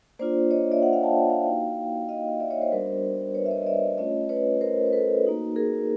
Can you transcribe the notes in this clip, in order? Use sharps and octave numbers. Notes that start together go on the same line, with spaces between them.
A#3 D4 F4 C5 D5
C#5 D#5
D5 E5
E5 F#5
F5 G5
G5 A5
F5 G5
A#3 D#4 F#4
D#5 F5
D5 E5
C#5 D#5
C5 D5
G3 B3 D4 F#4 A#4 C5
B4 C#5
E5
C#5 D#5
D#5
D5 E5
A3 C#4 F4 C#5 D#5
B4 C#5
A#4 C5
C5
A4 B4
A#3 D#4 F#4
G#4 A#4